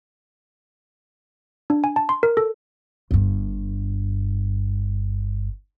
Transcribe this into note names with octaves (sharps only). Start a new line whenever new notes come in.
D4
G#5
A5
C6
A#4
A4
G1 G2